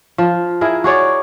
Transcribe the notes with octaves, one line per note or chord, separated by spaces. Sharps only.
F3
E4 G#4 A#4
F#4 G#4 C#5 D5